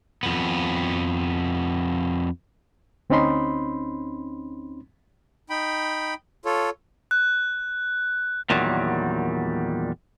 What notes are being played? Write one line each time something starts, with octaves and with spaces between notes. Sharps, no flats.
F2 B3
D2 C4 C#4 D#4 B5 C6
D#4 G5 B5
F4 A4 C#5
F#6
E2 A#2 D#3 F#3 G3